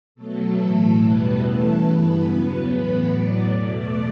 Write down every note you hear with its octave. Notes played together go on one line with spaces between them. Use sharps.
B2 F#3 A3 A4
A2 E3 A3
E2 B2 G3 B3 B4
C#3 E3 A3 A4
G2 E3 B3 B4
E2 C#3 F#3 B3
A2 E3 B3 B4
A2 F#3 B3 D5
E2 B2 A3 D5